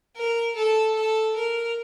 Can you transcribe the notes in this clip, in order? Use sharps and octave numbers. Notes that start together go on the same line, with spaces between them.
A#4
A4
A4
A#4